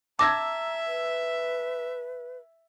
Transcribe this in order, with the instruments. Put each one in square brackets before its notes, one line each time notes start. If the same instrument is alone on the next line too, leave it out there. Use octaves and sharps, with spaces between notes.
[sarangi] E5 [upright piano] A5 E6 G#6 [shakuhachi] A#5 [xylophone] D6 A#6
[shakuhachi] B4